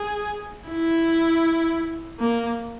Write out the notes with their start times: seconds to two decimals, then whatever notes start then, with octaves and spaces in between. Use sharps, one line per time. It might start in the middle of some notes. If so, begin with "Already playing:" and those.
Already playing: G#4
0.70 E4
2.19 A#3